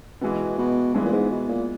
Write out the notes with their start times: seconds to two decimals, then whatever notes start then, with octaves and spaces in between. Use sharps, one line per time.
0.21 B2 E3 G#3 B3
0.58 B2
0.94 G2 E3 G#3 B3
1.05 A#2
1.12 G#2
1.30 B2
1.48 A#2